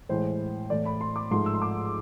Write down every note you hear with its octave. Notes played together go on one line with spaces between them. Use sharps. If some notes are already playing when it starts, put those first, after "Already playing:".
A2 E3 G#3 C5
A2 E3 A3 D5
B5
C6
D6
G#2 F3 A3 C6
E6
C6
D6